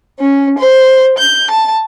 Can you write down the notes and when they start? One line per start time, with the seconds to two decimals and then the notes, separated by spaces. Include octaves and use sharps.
0.19 C#4
0.58 C5
1.17 G6
1.50 A5